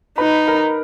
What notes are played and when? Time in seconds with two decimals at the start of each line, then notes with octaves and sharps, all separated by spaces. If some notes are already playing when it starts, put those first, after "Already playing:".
0.18 D#4 B4 B5
0.48 A#4 A#5